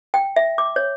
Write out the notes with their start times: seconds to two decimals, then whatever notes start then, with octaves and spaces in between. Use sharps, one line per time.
0.14 G5
0.36 E5
0.58 D6
0.76 C#5